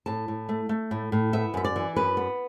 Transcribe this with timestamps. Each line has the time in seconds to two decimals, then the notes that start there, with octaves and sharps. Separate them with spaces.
0.06 A2 A5
0.28 A2
0.49 A3
0.69 A3
0.91 A2
1.12 A2
1.33 B3 E5
1.54 F#2 E5
1.65 D5
1.76 E3
1.96 F#2 B4
2.17 B3